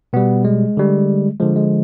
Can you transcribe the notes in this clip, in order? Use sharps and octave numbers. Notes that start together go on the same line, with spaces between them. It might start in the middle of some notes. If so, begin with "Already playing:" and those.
B2 G3 B3
G#3
D3 G3
D3 F3 G#3
G#3